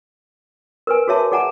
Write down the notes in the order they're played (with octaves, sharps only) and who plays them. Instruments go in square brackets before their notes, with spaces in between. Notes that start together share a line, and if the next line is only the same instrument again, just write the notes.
[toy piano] A#4 B4 G#5
F#4 G#4 C#5 E5 A5
G#4 D5 F#5 G#5 A#5